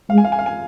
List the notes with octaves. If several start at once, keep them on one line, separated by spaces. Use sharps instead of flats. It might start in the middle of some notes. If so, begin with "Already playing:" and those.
G#3 F5
G#5
F5
G#5
F5
G#5